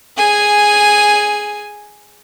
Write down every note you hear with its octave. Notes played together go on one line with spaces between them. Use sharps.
G#4 G#5